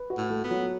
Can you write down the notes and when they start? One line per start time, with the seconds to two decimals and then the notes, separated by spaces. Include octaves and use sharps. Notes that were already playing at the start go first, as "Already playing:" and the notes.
Already playing: B4
0.10 F#4
0.18 A2
0.30 A3
0.44 B3
0.50 F#3